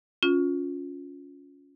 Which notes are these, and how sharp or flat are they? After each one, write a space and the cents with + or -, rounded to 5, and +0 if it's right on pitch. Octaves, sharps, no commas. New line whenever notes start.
C#4 +15 F4 +20